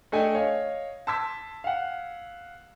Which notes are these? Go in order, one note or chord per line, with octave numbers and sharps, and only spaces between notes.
A3 D4 A4 D#5 G5 G#5
C#5 D#5 F5
A5 C6 D6 E6 G#6 B6
F5 F#5